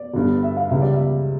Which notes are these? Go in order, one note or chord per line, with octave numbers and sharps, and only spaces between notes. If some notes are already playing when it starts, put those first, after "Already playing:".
Already playing: D5
G1 G2 D3
E5
F5
C#2 C#3 G3 E5
D5
E5